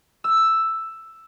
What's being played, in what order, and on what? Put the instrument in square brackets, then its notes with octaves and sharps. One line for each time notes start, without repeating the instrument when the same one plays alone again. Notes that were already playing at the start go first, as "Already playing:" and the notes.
[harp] E6